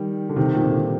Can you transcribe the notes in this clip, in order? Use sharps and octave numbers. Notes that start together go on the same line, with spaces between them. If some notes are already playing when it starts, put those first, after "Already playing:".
Already playing: D#3 G3
D3
C3 D#3
A#2
C3
D3
D#3